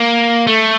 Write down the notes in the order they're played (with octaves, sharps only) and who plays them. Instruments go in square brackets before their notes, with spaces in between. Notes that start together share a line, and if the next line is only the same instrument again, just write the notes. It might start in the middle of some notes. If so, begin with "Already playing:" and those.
Already playing: [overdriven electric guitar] A#3
A3